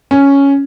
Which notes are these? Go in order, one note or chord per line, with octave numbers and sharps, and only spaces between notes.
C#4